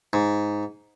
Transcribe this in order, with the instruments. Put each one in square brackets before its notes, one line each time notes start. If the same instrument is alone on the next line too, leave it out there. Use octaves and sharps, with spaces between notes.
[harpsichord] G#2